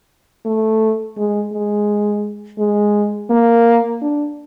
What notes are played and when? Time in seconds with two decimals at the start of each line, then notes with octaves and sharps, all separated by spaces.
0.46 A3
1.17 G#3
1.53 G#3
2.59 G#3
3.31 A#3
4.01 D4